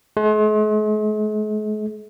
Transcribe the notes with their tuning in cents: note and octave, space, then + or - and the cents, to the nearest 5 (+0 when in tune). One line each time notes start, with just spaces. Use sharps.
G#3 +45